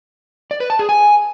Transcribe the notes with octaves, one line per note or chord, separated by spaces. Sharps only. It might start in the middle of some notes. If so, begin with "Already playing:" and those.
D5
B4
A5
G#4
G#5